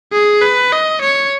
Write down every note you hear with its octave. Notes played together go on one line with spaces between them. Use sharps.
G#4
B4
D#5
C#5